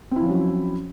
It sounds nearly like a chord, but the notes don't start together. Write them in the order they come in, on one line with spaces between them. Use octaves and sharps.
C4 E4 F3 C#4 F#3